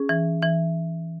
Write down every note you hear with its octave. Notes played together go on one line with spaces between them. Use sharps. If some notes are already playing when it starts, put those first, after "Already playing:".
Already playing: C#4 G#4
E3
E3